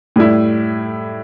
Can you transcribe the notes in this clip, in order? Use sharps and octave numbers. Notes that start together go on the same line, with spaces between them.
A2 G3 E4